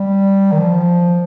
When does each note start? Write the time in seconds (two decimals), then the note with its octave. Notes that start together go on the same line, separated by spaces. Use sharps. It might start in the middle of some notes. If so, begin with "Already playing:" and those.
Already playing: G3
0.52 D#3
0.59 F3